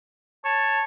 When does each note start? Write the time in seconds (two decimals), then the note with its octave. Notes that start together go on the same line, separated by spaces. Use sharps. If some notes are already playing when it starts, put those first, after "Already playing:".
0.45 C#5 A5